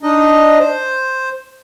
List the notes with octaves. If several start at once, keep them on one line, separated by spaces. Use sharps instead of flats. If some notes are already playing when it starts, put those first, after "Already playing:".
D4 D#4 D#5
C5